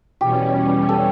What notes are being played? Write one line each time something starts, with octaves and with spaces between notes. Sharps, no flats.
E2 B2 G3 C#4 G4
A4